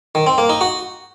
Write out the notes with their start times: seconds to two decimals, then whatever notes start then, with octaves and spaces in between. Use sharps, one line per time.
0.15 D#3
0.27 C4
0.38 A#3
0.49 D#4
0.61 F#4